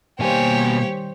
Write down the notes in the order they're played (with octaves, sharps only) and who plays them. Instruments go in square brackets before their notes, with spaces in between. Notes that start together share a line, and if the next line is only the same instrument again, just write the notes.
[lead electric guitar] B2 G#5 [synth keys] D#3 G3 C5 [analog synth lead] A#3 [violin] G4 C#5